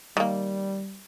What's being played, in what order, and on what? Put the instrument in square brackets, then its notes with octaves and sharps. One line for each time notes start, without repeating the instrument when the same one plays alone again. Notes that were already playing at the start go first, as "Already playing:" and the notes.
[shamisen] D#3 A#3 [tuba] G3